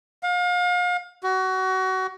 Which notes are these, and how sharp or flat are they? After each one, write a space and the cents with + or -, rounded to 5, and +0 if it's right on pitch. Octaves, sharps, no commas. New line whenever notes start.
F5 +35
F#4 +25